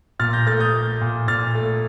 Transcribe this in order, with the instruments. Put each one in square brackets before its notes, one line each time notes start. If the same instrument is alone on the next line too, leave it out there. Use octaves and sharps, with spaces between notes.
[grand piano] A#2 F6 A6
G6 A#6
A3 F6 A6
D#6 G6
A3
A#2
A#2 F6 A6
A3